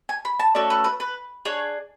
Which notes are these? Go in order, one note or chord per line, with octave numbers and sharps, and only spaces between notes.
G#5
B5
A5
A3 C#4 F#4 A4 D5
B4
B4
B4
D4 G#4 C#5